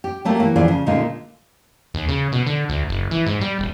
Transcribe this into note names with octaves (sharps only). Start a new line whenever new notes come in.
G4
F#3 G3 A3 A#3 F4 G4
E3 A#3
F2 A2 E3 F4 G#4 D5
C#3
A#2 D3 G#3 D#4 F4
D#2
C#3
B2
D3
D2
F#1
E3
G#2
G3
D#1